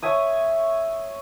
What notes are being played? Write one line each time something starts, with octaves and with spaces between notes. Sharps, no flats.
C#5 E5 G#5 D#6